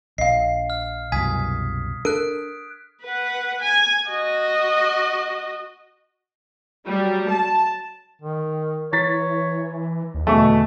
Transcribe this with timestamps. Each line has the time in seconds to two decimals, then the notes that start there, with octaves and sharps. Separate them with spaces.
0.18 A#1 D#5 F5 C7
0.70 F6
1.12 C2 F#2 B2 G#5 D#6 G#6 B6
2.05 D4 A4 A#4 F#6 D7
3.03 B4 F#5
3.62 G#5
4.09 F#4 D#5
6.86 F#3 G3
7.30 A5
8.22 D#3
8.93 E3 C#5 A#5 A6 B6
10.14 D#2
10.27 E2 B2 D3 A3 E5 C#6